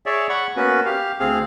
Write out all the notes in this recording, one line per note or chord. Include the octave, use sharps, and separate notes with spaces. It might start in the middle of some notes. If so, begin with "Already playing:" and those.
G#4 C#5 D5 E5
F#5 B5 C#6
A#3 B3 C#4 F#4 B4
G4 F5
D2 C4 G#4 F5